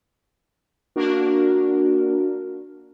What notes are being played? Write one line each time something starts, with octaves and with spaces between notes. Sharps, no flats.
A#3 D4 F#4 A#4